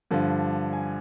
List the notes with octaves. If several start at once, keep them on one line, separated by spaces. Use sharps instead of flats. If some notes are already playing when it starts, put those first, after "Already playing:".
G2 D3 F3
G#5